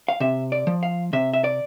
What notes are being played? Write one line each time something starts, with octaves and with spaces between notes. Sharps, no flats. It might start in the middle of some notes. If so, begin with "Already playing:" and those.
F5
C3 E5
D5
F3
F5
C3 E5
E5
D5